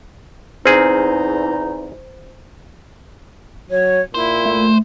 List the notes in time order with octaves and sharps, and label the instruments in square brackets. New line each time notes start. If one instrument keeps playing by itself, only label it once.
[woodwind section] E2 D#4 [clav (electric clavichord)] C4 G#4 [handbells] C5
[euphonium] F#3 [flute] C#5
[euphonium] A#2 [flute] E4 [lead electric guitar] C5
[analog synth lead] A3